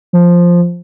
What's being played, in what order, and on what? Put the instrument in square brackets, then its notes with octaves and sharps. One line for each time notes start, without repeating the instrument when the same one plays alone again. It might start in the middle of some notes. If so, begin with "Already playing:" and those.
[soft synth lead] F3